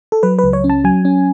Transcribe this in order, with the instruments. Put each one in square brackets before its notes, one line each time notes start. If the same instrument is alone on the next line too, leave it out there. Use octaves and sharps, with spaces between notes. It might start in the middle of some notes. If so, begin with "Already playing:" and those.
[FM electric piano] A4
F#3 B4
B4
C#2
C#5
C#4
A5
F#3 G#5
C#4